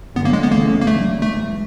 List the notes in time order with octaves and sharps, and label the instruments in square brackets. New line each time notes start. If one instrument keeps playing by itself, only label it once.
[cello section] G2 D3 F#3 [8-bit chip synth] B3
[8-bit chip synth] A#3
G#3
B3
[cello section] D2 C#3 E3 A3 [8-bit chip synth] A#3
[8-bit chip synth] A#3
[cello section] D2 D3 F#3 [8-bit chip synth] A3
[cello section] G#2 E3 G#3 [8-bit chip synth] A3